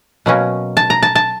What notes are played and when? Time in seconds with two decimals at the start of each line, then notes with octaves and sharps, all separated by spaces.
0.26 B2 F#3 A#3 C#4
0.77 A5
0.90 A#5
1.03 A5
1.15 A5